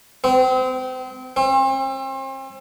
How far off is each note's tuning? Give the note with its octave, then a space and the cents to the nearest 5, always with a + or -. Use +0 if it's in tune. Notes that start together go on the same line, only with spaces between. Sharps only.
C4 -30
C4 +40